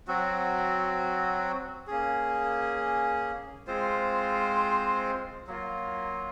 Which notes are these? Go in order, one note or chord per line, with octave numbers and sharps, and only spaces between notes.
F#3 C4 F#4
A#3 C#4 G#4
G#3 C4 F4 C5
F#3 A#3 F4